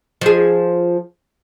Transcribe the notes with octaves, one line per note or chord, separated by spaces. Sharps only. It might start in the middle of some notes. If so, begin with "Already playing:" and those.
F3 G#4